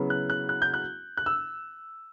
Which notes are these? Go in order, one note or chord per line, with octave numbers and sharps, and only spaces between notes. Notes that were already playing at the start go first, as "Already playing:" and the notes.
Already playing: C#3 F#3 B3 E4 B4
F#6
F#6
F#6
G6
F#6
F#6
E6